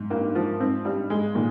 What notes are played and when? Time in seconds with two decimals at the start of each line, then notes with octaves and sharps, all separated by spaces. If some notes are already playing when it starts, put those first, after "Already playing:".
Already playing: G#2
0.10 G2 A#3
0.35 G#2 F3
0.60 G#2 C4
0.85 G2 G3
1.10 G#2 G#3
1.35 A#2 D#3